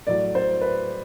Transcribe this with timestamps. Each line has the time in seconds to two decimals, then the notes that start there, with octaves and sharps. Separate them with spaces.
0.07 A2 F#3 D5
0.35 C5
0.61 B4